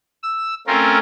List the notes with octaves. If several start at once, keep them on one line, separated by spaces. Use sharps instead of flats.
E6
A3 C4 C#4 F4 A#4